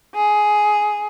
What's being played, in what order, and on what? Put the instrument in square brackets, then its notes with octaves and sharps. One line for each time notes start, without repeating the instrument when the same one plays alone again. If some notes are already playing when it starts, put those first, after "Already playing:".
[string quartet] G#4